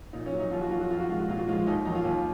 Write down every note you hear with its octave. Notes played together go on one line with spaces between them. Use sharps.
A#2 D#4
C#4
F#3
D#4
D#2 F4
F#4
D#3 F#3 F4
F#4
F2 F4
F#4
D#3 G#3 F4
F#4
A#2 F4
F#4
F3 G#3 F4
D#2 D#4
D#3 F#3 D#4
F4
D#2